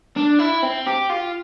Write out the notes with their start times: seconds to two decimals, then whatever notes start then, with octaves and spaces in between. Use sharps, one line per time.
0.17 D4
0.39 E4
0.63 C4
0.87 G4
1.10 F4